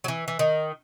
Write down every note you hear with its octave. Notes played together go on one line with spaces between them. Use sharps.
F#3
E3
E3
D#3